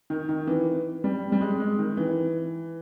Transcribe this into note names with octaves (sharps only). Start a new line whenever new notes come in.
D#3
D#3
E3
G3
G3
G#3
G#3
D#3
E3